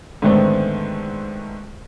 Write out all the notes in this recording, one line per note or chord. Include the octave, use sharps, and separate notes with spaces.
G#2 D3 D#3 A3 B3 C4